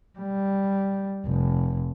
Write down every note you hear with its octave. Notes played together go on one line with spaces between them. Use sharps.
G3
F1